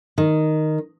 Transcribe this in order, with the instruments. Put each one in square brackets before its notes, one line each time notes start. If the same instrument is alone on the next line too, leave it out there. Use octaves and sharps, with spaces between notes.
[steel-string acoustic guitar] D#3